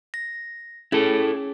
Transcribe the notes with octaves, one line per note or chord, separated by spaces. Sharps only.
A#6
C#4 E4 G#4 A4